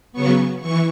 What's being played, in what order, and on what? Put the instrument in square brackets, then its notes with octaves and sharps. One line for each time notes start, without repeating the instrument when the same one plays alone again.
[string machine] C#3 F#3 B3 C#6
E3 C#6